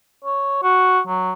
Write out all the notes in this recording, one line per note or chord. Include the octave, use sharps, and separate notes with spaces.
C#5
F#4
F#3